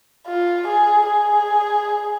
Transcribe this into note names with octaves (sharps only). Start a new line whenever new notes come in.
F4
G#4
G#4